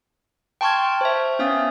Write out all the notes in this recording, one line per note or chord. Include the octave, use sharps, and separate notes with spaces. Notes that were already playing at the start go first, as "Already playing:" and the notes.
G5 A5 C6 C#6 F6 G#6
C5 E5
B3 C#4 E5 F5 D#6 A6